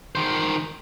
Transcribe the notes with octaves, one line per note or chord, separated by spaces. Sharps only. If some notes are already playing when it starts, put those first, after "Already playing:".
D#3 C5